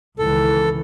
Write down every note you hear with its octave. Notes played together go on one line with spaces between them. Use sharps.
C#2 D#3 E3 A4